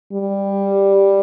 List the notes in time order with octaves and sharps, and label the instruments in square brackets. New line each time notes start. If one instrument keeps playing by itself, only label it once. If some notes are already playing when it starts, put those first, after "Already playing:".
[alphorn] G3